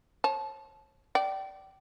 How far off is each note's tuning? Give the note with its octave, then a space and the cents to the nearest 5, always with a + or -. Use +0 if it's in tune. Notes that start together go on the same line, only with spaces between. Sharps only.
C#5 -40 A5 -20
D5 +0 G5 -30